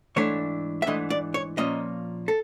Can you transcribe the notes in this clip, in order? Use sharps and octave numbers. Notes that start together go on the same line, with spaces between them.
G#2 E3 A3 D4 C#5
E5
G#2 E3 A3 D4 D#5
D5
C#5
A#2 F3 A#3 C#4 D#5
A4